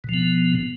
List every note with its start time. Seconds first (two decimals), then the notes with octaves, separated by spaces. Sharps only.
0.04 B2
0.09 F3
0.14 B3